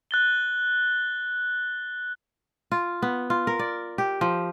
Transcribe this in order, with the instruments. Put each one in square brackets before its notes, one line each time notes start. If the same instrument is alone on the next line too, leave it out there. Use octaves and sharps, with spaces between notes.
[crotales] F#6 A6 G7
[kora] F4
B3
F4
A#4
D5
G4
F3